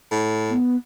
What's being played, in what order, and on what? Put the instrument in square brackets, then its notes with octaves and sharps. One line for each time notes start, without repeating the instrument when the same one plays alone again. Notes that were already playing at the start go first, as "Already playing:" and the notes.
[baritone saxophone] A2
[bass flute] B3